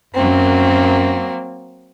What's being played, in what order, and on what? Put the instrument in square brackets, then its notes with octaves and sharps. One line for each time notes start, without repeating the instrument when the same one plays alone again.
[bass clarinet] F#2 [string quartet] F#3 A#3 C4